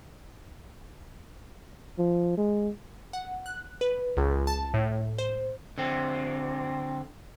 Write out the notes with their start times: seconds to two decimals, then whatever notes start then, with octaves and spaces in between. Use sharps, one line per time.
1.99 F3
2.38 G#3
3.13 F#5
3.46 F#6
3.81 B4
4.17 C#2
4.47 A5
4.74 A2
5.18 C5
5.78 D3 C4